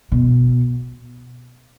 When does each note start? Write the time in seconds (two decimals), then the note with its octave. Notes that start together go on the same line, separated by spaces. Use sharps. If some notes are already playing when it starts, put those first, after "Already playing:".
0.12 B2